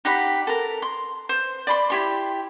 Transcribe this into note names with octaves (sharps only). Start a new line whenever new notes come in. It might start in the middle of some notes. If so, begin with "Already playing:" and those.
D#4 G4 F#5 B5
A4 A#4
C6
C5
D5 B5 C6
E4 G4 C6